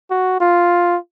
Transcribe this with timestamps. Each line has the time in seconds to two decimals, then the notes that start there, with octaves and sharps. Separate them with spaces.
0.11 F#4
0.41 F4